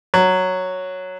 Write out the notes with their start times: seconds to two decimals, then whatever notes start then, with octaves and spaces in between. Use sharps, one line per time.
0.14 F#3